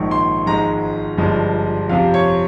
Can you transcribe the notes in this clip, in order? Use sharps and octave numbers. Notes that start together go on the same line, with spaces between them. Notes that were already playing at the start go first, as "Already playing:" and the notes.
Already playing: A#1 G#2 D#3 C#6
C6
G#1 G#2 F3 G#3 A#5
G1 G2 F3 G#3
F2 C3 F3 F5
C#5